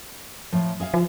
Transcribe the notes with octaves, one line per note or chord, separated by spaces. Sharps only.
A2 F3
G#4 E5 F5
F3